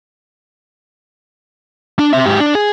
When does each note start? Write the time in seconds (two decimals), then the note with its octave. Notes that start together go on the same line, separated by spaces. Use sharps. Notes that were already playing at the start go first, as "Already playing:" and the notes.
1.99 D4
2.13 C4 E5
2.26 G#2 G4
2.40 D4
2.55 G#4